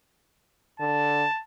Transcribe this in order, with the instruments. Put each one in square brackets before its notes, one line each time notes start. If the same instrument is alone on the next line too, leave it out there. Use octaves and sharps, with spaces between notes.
[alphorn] D3 [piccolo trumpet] A5